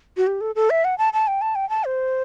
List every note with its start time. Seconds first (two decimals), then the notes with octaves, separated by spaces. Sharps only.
0.17 F#4
0.27 G4
0.41 A4
0.55 A4
0.70 E5
0.84 F#5
0.98 A5
1.13 A5
1.27 G5
1.41 A5
1.55 G5
1.70 A5
1.85 C5